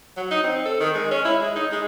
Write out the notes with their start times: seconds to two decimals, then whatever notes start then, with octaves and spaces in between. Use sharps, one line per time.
0.17 F#3
0.31 D#4
0.43 C4
0.66 A4
0.80 D#3
0.95 G#3
1.11 C#4
1.25 E4
1.41 G#3
1.56 D#4
1.72 G#3